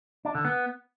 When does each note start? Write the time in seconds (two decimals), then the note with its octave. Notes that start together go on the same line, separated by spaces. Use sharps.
0.25 D4
0.35 D3
0.45 B3